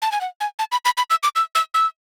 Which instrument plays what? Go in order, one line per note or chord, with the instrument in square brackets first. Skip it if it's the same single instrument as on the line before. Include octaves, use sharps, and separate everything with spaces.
[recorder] A5
G#5
F#5
G#5
A5
B5
B5
B5
E6
D6
E6
E6
E6